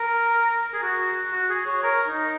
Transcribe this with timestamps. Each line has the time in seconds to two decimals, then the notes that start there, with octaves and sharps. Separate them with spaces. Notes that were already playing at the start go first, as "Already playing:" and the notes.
Already playing: A#4
0.73 G#4
0.82 F#4
1.32 F#4
1.49 G#4
1.66 C#5
1.83 A#4
2.08 D#4